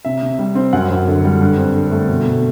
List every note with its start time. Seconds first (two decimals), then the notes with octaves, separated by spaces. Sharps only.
0.05 C3 E5
0.23 C3
0.39 G3
0.55 C4
0.73 F#2 F#5
0.91 F#2
1.07 D3
1.24 G3
1.41 G2
1.57 C4
1.75 D3
1.91 A3
2.08 B2
2.26 B2